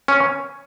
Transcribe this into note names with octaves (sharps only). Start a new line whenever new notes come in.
C#4